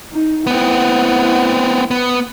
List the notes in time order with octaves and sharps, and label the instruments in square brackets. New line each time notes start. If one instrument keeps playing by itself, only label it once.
[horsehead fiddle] D#4
[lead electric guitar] B3 C4 [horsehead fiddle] E4 F#5
[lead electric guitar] B3